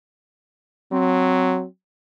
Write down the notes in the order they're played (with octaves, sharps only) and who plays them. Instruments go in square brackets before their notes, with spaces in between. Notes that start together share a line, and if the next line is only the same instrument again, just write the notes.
[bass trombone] F#3 [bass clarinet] C4